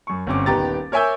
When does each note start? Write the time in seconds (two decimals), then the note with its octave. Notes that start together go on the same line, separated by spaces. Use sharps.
0.07 F#2 C#6
0.27 G1 C4 C#4 D6
0.46 D#1 D#3 B3 G4 A#5 A6
0.92 A#4 C#5 E5 G#5 E6 G6